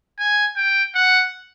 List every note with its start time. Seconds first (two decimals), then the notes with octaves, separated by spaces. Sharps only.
0.19 G#5
0.57 G5
0.95 F#5